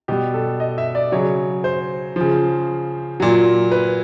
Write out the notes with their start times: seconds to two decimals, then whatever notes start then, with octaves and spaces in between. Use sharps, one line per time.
0.08 B2 G3 G4
0.34 A4
0.60 D#5
0.78 E5
0.95 D5
1.12 C#3 F#3 C#5
1.64 C5
2.16 C#3 F3
3.20 A#2 F#3
3.72 B4